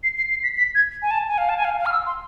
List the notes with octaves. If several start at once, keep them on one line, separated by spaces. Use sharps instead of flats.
C7
C7
C7
B6
B6
G#6
G#5
A5
G#5
F5
A5
G#5
F5
F5
F6
E6
C6